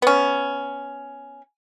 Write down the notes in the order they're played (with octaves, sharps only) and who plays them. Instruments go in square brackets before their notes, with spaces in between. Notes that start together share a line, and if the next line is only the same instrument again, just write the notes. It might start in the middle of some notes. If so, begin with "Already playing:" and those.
[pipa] B3 C#4